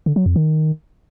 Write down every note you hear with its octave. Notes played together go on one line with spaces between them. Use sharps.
D3
F#3
F2
D#3